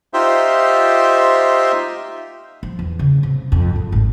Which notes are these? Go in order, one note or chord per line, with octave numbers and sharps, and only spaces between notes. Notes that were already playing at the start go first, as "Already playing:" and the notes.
D#4 F4 G4 C5 E5
F3
E2
C#3
C3
F2
G#2
G#1